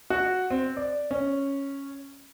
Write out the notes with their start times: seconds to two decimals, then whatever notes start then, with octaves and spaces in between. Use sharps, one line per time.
0.10 F#4
0.50 C4
0.77 D5
1.11 C#4